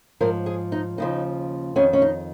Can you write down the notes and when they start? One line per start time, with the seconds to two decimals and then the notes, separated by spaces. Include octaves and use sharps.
0.21 G#2 F3 A#4
0.46 G#4
0.72 D#4
0.98 D#2 C#3 F3 D#4
1.76 F2 D#3 C#4
1.93 C#4
2.02 D#4